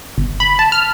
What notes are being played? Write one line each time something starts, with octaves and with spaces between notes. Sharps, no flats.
G1
B5
A5
F6